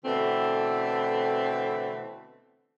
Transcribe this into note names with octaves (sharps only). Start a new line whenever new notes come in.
B2 D3 E3 A3 C4